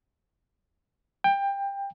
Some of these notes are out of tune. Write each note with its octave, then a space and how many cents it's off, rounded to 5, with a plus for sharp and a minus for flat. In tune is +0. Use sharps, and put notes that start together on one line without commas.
G5 +20